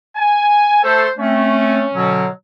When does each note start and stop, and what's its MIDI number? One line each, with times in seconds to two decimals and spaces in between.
0.16 0.80 80
0.84 1.07 57
0.84 1.07 69
0.84 1.11 72
1.18 1.82 57
1.18 1.82 60
1.18 2.25 61
1.94 2.27 47
1.94 2.27 50
1.94 2.27 54